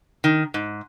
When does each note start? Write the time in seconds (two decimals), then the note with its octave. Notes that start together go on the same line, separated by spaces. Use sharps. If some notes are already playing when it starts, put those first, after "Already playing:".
0.24 D#3
0.54 G#2